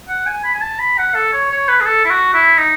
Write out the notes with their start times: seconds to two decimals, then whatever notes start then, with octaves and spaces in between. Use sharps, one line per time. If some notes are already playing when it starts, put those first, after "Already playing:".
0.09 F#5
0.26 G#5
0.44 B5
0.54 G#5
0.61 A5
0.79 B5
0.98 F#5
1.15 A4
1.33 C#5
1.51 C#5
1.68 B4
1.81 G#4
1.86 A4
2.05 E4
2.10 F#4
2.34 E4
2.58 D#4